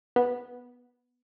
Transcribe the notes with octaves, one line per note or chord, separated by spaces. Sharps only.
B3